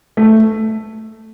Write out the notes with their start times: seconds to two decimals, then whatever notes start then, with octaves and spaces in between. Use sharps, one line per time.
0.17 A3